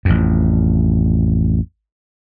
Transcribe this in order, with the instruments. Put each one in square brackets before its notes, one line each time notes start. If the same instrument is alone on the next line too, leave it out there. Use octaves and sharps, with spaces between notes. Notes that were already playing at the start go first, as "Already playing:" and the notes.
[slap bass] A1 F2